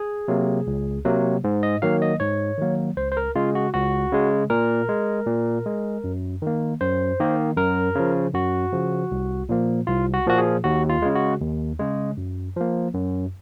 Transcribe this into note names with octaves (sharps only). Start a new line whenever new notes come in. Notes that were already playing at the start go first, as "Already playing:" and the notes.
Already playing: G#4
C3 F#3 A#3
C#2
C3 F#3 A#3
G#2
D#5
D#3 F#3 A#3 F5
D#5
G#2 C#5
D#3 F#3 A#3
C#2 C5
C5
A#4
C#3 G#3 F4
F#4
C#2 F#4
C#3 G#3
A#2 A#4
G#3
A#2
G#3
F#2
D#3 A#3
F#2 C5
D#3 A#3
F#2 A#4
C#3 F3
F#2 F#4
C#3 F3
C2
A#2 F3 A#3
C2 F4
F#4
A#2 F3 A#3 F#4
G#4
D#2 F#4
F4
C#3 G#3
F#4
D#2
C#3 G#3
F#2
F3 A#3
F#2